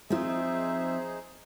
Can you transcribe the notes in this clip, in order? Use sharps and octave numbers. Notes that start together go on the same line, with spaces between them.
F3 G#3 C4 D#4 F4 G#4 C5 E5